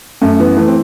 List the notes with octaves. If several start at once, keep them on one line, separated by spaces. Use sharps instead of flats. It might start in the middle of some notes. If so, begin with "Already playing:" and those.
F#2 A3
E3 B3
E3 A3
C4